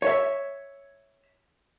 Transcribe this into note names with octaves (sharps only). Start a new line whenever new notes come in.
C#5 E5